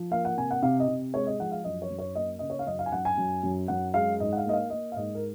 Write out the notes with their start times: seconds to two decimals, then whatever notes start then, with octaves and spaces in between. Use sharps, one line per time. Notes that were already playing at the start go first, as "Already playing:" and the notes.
Already playing: F3
0.11 A#3 F5
0.25 F#5
0.37 C3 G#5
0.51 F#5
0.62 C3 F5
0.80 D#5
0.88 C3
1.14 G#3 C#5
1.27 D#5
1.39 F3 F#5
1.52 F5
1.64 F#2 D#5
1.82 C#5
1.90 F#2
1.99 C#5
2.15 A#3 D#5
2.39 C#3 D#5
2.50 C#5
2.59 F5
2.67 F#2 D#5
2.79 F5
2.86 G#5
2.92 F#2 F#5
3.05 G#5
3.17 F#2
3.43 F#2
3.68 F#2 F#5
3.94 G#3 F5
4.20 G#2 D#5
4.33 F#5
4.37 F5
4.45 A#3 D#5
4.53 F5
4.70 A#3 D#5
4.92 F5
4.96 G#2 D#5
5.15 A#4